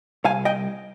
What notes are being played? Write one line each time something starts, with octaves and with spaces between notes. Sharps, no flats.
C2 F5 G#5
D#5 G5